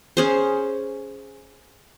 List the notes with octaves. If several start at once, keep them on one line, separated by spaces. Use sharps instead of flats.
C#4 G#4 C5